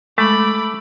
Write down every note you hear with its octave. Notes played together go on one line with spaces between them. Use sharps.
G#3 A3 B5 D6